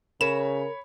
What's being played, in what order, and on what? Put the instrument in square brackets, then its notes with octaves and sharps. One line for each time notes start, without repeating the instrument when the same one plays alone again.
[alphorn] C#3 [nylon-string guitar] A#4 [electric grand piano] C#5 B5 [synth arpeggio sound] E7